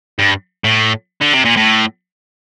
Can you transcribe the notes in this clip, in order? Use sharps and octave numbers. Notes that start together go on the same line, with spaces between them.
G2
A2
D3
C3
A#2
A2